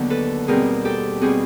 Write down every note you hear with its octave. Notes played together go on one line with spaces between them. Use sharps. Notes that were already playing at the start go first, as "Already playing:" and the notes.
Already playing: D#2 D3 F#3 B3
A4 B4
B2 G3 C4 G#4 A#4
G4 A4
B2 G3 C4 F#4 G#4